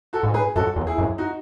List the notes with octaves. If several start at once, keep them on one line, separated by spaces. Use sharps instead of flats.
F#4 A4
G#2
G#4 B4
F#2 F#4 A4
E2
E4 G#4
F#2
D#4 F#4